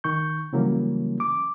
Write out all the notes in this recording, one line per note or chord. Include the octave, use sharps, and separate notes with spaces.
D#3 C#6 G6
C#3 E3 F#3 G3 A#3 C#4
D6